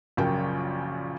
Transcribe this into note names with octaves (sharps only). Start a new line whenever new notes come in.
A#1 F#2 C#3 A#4 G5